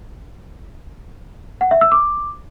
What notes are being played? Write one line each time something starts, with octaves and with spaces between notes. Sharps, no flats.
F#5
E5
E6
D6